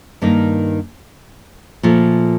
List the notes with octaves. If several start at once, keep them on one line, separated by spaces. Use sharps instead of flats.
G2 D#3 A#3 D#4
A#2 F3 A3